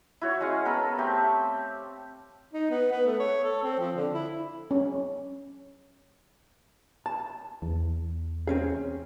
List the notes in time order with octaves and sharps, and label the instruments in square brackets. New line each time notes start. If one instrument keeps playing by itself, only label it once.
[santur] E4 F#4 C#5
G#3 C#4 F5 F#5
B3 A4 A#4 B5
A3 C4 G4
[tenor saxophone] D#4
B3
B3
A3
C#5
A4
C4
F3
D3
E4
[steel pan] C#4
[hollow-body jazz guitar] A5
[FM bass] E2
[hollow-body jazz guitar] C4 C#4 G#4